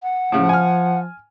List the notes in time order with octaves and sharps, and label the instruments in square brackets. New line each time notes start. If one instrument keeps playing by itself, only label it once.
[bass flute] F#5
[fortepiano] A2 C#3 [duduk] F3
[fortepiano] G#5 F6